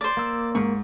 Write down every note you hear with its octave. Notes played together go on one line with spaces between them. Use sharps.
C5 D5
A#3 E6
G#2 C#6